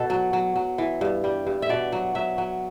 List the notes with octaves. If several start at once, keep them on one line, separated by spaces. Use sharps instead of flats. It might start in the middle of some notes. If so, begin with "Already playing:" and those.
Already playing: B2 A4
F#3
F#3
F#3
E3
G2
G3
G2
E5
B2 D5
F#3
F#3 E5
F#3